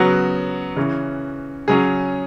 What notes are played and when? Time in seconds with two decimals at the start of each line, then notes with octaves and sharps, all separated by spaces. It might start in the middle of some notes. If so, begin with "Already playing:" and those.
Already playing: C#3 F#3 B3 F#4
0.76 C#3 E3 C#4
1.68 C#3 F#3 C#4 G#4